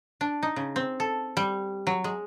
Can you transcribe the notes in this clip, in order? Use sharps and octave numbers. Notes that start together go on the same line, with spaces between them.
D4
D#4
C#3
C4
A4
G3
F#3
G#3